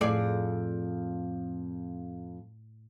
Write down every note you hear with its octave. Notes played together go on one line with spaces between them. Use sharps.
F2 A2 G#4 D5